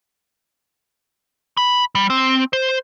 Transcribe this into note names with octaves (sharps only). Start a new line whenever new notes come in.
B5
G3
C4
C5